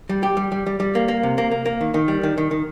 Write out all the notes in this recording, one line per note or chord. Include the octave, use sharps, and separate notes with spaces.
G3
G4
G3
G3
G3
G3
A#3
A#3
C3
A#3
A#3
A#3
D#3
D#3
G3
D#3
D#3
D#3